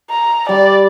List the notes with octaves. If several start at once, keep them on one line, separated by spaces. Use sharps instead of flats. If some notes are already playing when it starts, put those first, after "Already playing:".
A#5
G3 D5